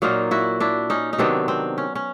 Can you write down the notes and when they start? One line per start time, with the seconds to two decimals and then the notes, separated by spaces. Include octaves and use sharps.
0.02 A#2 F#3 A#3 D#4 F4
0.31 E4 F#4
0.60 D4 E4
0.90 C#4 D#4
1.13 D#4
1.18 C3 D#3 F#3 B3 C4 D4
1.48 C4
1.78 C#4
1.95 C#4